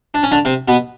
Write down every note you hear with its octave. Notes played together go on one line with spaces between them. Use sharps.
D4
C#4
D3 D4
C3 C4
B2 B3